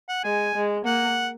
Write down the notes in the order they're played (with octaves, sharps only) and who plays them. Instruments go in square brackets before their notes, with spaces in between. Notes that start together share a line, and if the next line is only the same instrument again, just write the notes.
[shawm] F#5
[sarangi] G#3 [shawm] G#5
[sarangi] G#3
[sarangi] A#3 [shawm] F#5